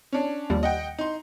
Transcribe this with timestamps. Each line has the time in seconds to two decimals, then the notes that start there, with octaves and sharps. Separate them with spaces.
0.12 C#4 D4
0.50 D#2 F3 G3
0.63 D#5 F#5 G5
0.99 D#4 C6